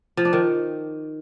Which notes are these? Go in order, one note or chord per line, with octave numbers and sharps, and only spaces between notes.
F3
D4
D#3